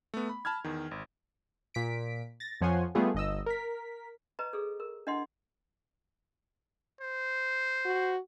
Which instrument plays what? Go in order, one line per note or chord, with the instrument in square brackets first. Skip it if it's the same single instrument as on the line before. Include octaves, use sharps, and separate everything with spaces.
[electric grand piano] A3 B3
B5
A5 B5 F6 G#6
E2 D#3
G#1
[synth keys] A#2 B6 D7
A6 A#6
F2 F3 C#5 F#5 G#5 C6
G3 A3 B3 F4 G#4
G1 D#5 E6
A#4 B6
[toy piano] B4 D#5 A#5
G#4 A4
A#4
D4 E4 D#5 F#5 C6
[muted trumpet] C5
[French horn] F#4